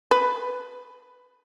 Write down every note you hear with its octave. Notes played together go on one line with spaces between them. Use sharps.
B4